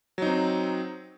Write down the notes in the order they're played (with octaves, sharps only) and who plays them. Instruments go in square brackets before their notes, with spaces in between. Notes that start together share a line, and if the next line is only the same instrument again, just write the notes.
[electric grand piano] F#3
D#4
C4